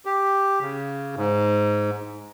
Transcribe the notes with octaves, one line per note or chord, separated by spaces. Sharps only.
G4
C#3
G#2